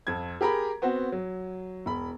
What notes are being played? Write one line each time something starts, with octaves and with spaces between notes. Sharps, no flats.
F2 G#6
G4 G#4 A#4 A#5 B5
B3 C4 F#4
F#3
E1 B5